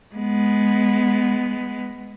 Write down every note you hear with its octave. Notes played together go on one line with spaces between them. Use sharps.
G#3 B3